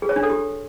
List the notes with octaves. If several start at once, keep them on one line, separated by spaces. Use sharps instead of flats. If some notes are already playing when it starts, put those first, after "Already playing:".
G#4
C#5
D4
A4
G4